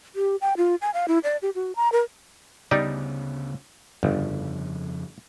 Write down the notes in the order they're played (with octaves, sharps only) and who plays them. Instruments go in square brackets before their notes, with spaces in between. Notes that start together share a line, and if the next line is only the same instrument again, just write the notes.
[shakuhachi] G4
G5
F4
G#5
F5
E4
D5
G4
F#4
A#5
A#4
[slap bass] D2 C#3 B3 [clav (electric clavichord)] G3 D#4 D5
[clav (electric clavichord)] G1 [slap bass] F2 C#3 F3